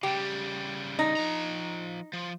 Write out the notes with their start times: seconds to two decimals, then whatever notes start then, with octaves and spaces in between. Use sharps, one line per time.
0.03 C#3 G3 G4
0.99 D#4
1.17 F3 A#5
2.13 F3